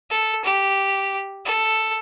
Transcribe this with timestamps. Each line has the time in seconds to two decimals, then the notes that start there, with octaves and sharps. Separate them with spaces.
0.10 A4
0.45 G4
1.45 A4